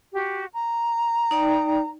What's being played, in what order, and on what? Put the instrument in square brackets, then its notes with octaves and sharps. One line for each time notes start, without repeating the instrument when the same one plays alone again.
[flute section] F#4 G4
A#5
[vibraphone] D#4 D5 G5